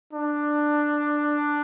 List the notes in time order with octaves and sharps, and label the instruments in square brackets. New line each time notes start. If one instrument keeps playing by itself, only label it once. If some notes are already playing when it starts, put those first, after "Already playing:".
[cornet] D4